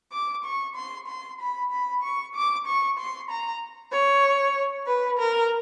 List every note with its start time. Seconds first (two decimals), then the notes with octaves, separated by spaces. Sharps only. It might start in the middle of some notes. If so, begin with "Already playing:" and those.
0.12 D6
0.45 C#6
0.76 C6
1.08 C6
1.40 B5
1.71 B5
2.03 C#6
2.35 D6
2.66 C#6
2.98 C6
3.30 A#5
3.92 C#5
4.87 B4
5.18 A#4